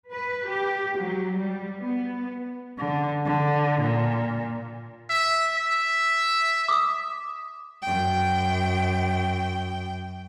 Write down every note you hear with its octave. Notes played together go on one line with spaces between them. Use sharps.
B4
G4
F#3
G3
B3
D3
D3
A#2
E5
E5
D6 D#6
F#2 G5